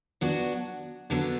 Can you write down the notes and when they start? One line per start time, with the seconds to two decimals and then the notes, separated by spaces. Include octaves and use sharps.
0.21 F#3 B3 D4 F#4
1.10 D3 F#3 B3 D4